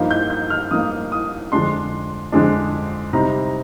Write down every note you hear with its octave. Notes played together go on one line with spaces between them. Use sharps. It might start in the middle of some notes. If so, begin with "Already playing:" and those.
Already playing: G2 F3 A#3 D#4
G6
G6
F6
G2 F3 A#3 D#4 D#6
D#6
F2 D3 G#3 D4 C6
F2 D3 G#3 D4
C3 G3 C4 D#4 A#5